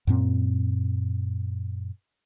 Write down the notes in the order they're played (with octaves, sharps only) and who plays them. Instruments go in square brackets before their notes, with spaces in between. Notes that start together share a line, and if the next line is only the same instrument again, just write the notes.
[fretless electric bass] F#2 A#2 C4